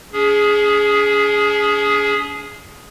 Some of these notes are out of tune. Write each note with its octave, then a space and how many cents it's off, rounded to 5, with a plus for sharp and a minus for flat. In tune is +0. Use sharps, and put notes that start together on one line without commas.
C#4 +45 G#4 +0